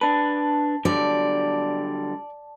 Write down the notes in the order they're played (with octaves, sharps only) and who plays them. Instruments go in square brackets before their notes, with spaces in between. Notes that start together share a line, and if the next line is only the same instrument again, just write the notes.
[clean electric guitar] D4 B4 [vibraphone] A5
[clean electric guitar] D3 F#3 G3 [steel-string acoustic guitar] D5